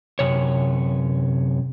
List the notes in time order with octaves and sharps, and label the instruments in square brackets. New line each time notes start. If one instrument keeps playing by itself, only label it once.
[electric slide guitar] F#2 C3 C#5